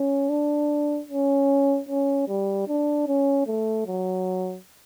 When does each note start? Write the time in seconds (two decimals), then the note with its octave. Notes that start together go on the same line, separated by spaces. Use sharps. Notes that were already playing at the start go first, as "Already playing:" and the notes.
Already playing: C#4
0.29 D4
1.09 C#4
1.89 C#4
2.28 G3
2.68 D4
3.07 C#4
3.47 A3
3.87 F#3